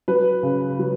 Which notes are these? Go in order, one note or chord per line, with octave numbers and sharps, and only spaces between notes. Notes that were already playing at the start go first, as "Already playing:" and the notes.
F#3 B4
C#3
F#3